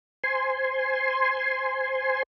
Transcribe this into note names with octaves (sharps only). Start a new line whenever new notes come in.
C5 G#5 C6